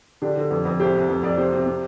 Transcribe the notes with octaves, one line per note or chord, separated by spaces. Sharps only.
D3 D4 G4
D3
F2
F2
C2 G4 C5
C2
F2
F2 D5
C3 G4 C5
C3
C3